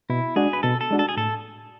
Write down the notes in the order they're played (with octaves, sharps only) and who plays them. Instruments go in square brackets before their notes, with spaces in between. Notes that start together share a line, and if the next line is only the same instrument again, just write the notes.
[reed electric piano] B2 [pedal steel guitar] E4
[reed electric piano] G#3 D4 F#4 [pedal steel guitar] G#4
[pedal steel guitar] B4
[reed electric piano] B2 [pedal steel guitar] A4
[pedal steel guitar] A4
[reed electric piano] G#3 D4 F#4
[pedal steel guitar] A4
G#4
[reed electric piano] A2 [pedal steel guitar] A4